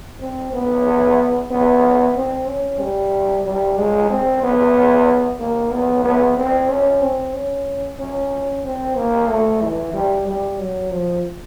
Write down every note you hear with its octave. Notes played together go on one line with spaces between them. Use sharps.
C4
B3
B3
C4
C#4
G3
G3
G#3
C4
B3
A#3
B3
B3
C4
C#4
C4
C#4
C#4
C4
A#3
A3
E3
G3
G3
F#3
F3